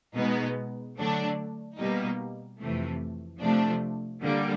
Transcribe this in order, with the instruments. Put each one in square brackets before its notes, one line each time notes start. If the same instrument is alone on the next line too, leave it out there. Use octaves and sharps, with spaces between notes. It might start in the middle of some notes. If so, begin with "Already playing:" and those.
[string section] B2 G#3 B3 D#4
D3 F#3 A3 D4
B2 G3 A#3 D#4
F2 C3 E3 A3
C3 F3 A3 D4
D3 G3 A#3